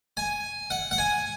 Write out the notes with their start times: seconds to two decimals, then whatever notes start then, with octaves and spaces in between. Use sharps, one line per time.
0.17 G#5
0.70 F#5
0.91 F#5
0.98 G#5